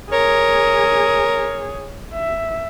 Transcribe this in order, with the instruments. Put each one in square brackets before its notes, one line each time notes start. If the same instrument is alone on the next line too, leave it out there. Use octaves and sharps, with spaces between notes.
[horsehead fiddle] G#4 [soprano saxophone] A#4 [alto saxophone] C#5
[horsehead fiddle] E5